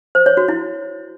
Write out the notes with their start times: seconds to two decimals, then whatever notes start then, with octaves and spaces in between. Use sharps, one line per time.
0.15 C5
0.26 C#5
0.37 F#4
0.48 E4